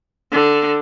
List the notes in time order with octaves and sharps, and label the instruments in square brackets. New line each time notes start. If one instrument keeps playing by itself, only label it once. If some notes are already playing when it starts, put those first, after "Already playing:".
[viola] D3